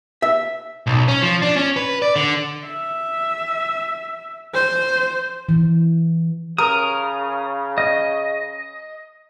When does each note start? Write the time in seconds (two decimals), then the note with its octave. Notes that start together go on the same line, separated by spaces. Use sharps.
0.22 E5
0.87 B1
1.08 C#4
1.22 F3
1.42 D4
1.56 C#4
1.77 B4
2.02 D5
2.16 D3
2.67 E5
4.54 C5
5.49 E3
6.58 C#3 A#4 D#6
7.78 D#5